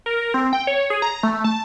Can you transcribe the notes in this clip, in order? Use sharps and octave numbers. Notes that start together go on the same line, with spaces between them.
A#4
C4
G5
C#5
G#4
A#5
A3
A5